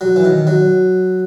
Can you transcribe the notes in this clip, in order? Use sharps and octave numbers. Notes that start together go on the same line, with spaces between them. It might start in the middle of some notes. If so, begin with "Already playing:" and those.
F#3
E3
D#3
F#3